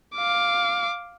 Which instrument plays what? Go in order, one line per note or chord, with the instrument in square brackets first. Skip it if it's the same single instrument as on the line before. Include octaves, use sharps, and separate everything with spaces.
[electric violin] F5 D6